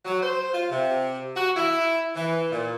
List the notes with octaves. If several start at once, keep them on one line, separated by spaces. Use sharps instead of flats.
F#3
C5
F4
C3
F#4
E4
E3
A#2